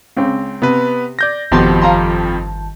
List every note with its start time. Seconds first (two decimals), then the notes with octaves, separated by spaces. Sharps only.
0.17 C#2 C4
0.62 C3 B3 B4
1.19 D5 G6 A#6
1.52 G1 F2 B2 D#3 F3 G4 A5 C6
1.82 F5 A#5 C6